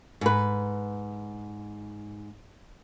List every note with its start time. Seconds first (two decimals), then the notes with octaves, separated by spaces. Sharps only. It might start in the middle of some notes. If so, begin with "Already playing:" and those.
0.21 G#2 B4